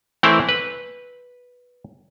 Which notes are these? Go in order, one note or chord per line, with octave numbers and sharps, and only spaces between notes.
E3 A3 C4 E4 A#4
B4